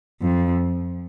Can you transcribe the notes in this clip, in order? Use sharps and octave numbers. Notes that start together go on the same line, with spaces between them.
F2